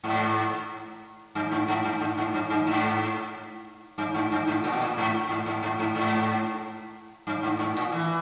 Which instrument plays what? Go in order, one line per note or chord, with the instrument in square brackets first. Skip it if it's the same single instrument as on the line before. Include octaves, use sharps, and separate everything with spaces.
[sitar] G#2
G2
G#2
G#2
G2
G#2
G#2
G2
G2
G#2
G2
G#2
G2
G#2
A#2
B2
A#2
G#2
G#2
G#2
G#2
G#2
G#2
G2
G#2
G#2
A#2
E3